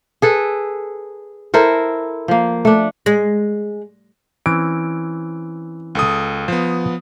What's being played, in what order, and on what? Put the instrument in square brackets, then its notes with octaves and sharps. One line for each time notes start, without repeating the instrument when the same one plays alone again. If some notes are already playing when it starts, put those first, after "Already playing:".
[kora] G#4 A4 B4
E4 A4 A#4 C5
F3 A#3
A3 D4
[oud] G#3
[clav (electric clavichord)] E3 C4 C#4 [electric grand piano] D7
[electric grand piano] C#2 A4 D#6
[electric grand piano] F3 B3 [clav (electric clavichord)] C5 F5